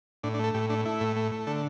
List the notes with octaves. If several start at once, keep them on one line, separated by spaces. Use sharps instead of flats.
A2 D4
D4
A3 A4
A2 G4
A3 D4
A3 E4
A2
A3
A3
D3 A4